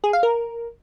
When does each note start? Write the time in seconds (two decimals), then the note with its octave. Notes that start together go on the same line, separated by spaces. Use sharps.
0.04 G#4
0.13 F5
0.23 A#4